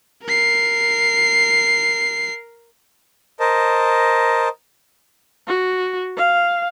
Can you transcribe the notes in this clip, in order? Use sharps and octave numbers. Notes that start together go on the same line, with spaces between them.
A#4 C7
A#4 C5 D#5 A5
F#4
F5